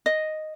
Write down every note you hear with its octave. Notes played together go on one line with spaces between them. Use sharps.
D#5